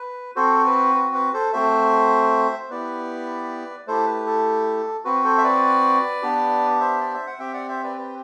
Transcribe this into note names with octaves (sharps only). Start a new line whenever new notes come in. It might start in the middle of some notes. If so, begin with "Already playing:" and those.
Already playing: B4
C4 F#4 A4 C5
B4
B4
B4
A4 C5
A3 C4 F#4 C5 E5
C5
B3 E4 G4 B4 D5
A3 E4 G4 A4 C5
B4
A4
C4 F#4 B4
A4 C5
E5
B4 D5
B3 D4 G4
C5 E5
D5
E5
F#5
C4 G4 E5 G5
D5 F#5
C5 E5
B4 D5
B4